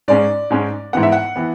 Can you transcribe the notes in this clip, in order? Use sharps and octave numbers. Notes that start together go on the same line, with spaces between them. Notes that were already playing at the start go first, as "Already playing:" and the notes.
G#2 G#3 C#4 D5
G#2 G#3 C#4
G#2 E3 B3 F#5
E5
F#5
E3 B3